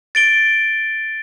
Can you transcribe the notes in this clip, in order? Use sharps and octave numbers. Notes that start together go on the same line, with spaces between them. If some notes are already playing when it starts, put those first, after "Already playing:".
A6 D7 G7